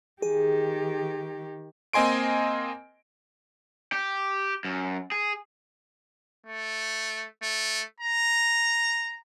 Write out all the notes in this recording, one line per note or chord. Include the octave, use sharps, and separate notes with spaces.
D#3 G4 G#4
A#3 C4 D#5 G#5 C6 D7
G4
F#2
G#4
A3
A3
A#5